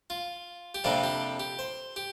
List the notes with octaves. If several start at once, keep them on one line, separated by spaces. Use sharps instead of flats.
F4
G4
F2 C3 G3 A#3 D4 F4
G4
G4
C5
G4